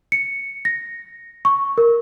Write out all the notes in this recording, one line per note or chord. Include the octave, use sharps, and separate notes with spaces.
C#7
A#6
C#6
A#4